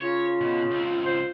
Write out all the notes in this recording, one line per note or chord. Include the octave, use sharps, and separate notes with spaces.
C#3 F4 C#5
B2
C#2 C4
C5